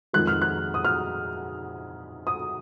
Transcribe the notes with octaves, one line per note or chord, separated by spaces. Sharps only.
F2 D#3 G#3 F#6
F6
F#6
D#6
F6
D#6